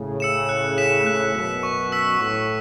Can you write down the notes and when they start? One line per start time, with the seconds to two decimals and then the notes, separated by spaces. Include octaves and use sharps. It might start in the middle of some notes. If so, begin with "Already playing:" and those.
Already playing: A2 C#3
0.20 E6 C#7 E7
0.49 F#6
0.78 B6 E7
1.06 A2 C#3 F#6
1.34 F#2 B2 B6 E7
1.63 C#6
1.92 E6 B6
2.20 A2 C#6